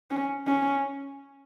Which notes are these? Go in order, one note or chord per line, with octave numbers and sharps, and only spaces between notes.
C#4
C#4